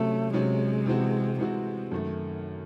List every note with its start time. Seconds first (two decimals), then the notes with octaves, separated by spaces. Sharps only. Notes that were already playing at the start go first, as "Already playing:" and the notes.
Already playing: C3 F#3 A3 C#4
0.33 C3 F#3 G#3 C#4
0.86 C3 E3 C4 F#4
1.38 C3 E3 G#3 C4 F#4
1.92 F#2 D#3 A3